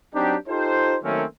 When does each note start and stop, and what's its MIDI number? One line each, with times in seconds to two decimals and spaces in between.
0.14 0.35 54
0.14 0.35 60
0.14 0.35 62
0.14 0.35 63
0.14 0.35 67
0.48 0.96 63
0.48 0.96 65
0.48 0.96 67
0.48 0.96 69
0.48 0.96 72
1.03 1.24 51
1.03 1.24 54
1.03 1.24 57
1.03 1.24 58
1.03 1.24 60
1.03 1.24 61